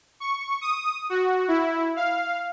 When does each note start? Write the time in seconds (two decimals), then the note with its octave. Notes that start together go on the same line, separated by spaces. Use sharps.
0.20 C#6
0.61 D#6
1.10 F#4
1.48 E4
1.96 F5